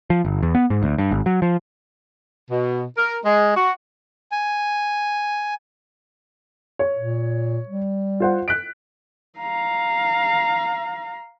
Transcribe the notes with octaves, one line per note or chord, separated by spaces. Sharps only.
F3
G1
E2
B3
G#2
D2
G2
G#1
F#3
F3
B2
A#4
G#3
F#4
G#5
C#5
A#2
G3
F4 C5 F#5
F#6 B6 D7
F5 A#5